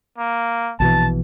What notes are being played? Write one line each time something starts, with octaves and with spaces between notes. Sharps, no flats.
A#3
A#1 B2 E3 A5